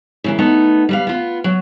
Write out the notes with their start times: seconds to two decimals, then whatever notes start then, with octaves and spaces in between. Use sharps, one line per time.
0.24 C#3 E3 A#3
0.38 A3 B3 D#4
0.89 G3 B4 F5
1.07 B3 F4
1.44 F#3